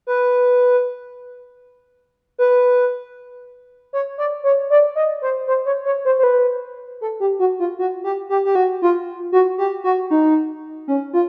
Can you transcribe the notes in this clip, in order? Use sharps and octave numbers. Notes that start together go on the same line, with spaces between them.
B4
B4
C#5
D5
C#5
D5
D#5
C5
C5
C#5
C#5
C5
C5
B4
A4
G4
F#4
F4
F#4
G4
G4
G4
F#4
F4
F#4
G4
F#4
D#4
C#4
F4